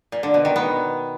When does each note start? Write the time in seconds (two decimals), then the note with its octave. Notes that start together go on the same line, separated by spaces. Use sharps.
0.12 A#2
0.23 D3
0.34 B2
0.45 D#3
0.56 B3